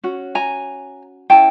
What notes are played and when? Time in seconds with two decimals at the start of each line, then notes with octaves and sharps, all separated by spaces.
0.03 C#4 F#4
0.35 G#5 A#5
1.30 C#4 E4 A4 G5 A5